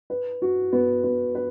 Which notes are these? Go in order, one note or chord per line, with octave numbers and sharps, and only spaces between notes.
B4
F#4
B3
B3
B4